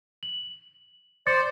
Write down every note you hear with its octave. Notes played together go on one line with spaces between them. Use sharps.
F#7
C5 D5 D6 A6 C#7